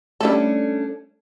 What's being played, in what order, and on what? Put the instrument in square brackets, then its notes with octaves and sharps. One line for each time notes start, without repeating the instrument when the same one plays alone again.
[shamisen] G3 E4 A4 [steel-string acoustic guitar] A3 C#4 D4